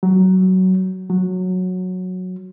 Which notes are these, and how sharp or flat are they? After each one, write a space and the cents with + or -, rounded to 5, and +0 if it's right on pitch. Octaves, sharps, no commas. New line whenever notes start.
F#3 +15
F#3 -10